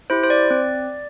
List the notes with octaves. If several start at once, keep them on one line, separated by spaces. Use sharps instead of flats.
E4 G4 C5
C5
D5
C4